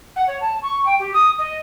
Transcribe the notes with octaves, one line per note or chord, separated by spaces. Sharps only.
F#5
C#5
A5
C#6
G5
G4
D#6
D#5